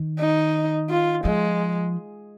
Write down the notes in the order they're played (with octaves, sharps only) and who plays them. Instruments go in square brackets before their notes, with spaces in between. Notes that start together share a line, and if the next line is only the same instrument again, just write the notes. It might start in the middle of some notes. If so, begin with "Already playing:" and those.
Already playing: [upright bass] D#3
[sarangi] D#4
F4
[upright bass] F3 [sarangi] G#3